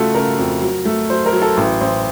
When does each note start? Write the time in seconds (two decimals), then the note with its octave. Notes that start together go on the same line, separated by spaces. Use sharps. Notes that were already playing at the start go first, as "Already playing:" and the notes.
Already playing: C#3 A3 F4 F#4 A4
0.15 C#3 A#4
0.38 F2
0.62 F#3
0.85 A3
1.10 F#3 C5
1.26 A#4
1.33 F#3
1.42 A4
1.57 A1
1.81 A1 C5